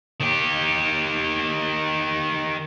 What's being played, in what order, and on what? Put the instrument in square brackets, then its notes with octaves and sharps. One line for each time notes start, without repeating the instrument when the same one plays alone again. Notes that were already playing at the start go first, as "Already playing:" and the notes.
[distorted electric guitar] D#3 G4